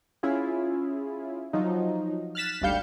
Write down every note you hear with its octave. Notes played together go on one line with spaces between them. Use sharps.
C#4 E4 F4 G#4
F3 F#3 D#4
F6 F#6 A6 B6 E7
G#1 D2 G3 F5 G6 C#7